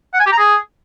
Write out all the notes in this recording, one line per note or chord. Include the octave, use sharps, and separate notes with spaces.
F#5
G#5
G4
A#5
G#4